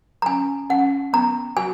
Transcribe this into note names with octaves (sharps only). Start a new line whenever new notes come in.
A#5
C#4 G#5
C#4 F#5
B3 A#5
F#4 G#5